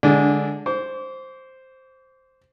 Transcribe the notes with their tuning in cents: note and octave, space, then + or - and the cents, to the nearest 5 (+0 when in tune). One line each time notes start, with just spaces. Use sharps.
D3 +0 G#3 +0 D4 -20
C5 +0 D6 -40